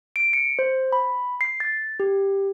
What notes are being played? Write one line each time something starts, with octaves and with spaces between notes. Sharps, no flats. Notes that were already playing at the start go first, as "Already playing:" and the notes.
D7
C#7
C5
B5
C7
A6
G4